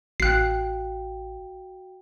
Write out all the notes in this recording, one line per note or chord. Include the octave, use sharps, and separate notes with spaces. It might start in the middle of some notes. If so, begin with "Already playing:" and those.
A1 F#4 F5 G5 F#6 C7